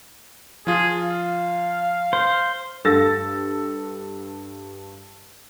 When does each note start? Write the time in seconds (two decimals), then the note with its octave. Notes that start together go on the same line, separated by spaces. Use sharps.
0.67 F3 F4 G#4
0.99 F5
2.13 C5
2.85 G2 A4 E6 A6 A#6